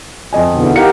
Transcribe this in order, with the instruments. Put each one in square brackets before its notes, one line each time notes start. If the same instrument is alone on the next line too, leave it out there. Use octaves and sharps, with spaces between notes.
[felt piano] F2 D#5 G#5
[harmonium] E2 B2 D3
[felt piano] E3
[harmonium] D#4 G4 A#4 [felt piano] F5 F#5 C#7